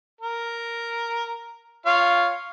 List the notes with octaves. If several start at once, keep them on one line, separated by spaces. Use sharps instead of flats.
A#4
F4 C#5 F5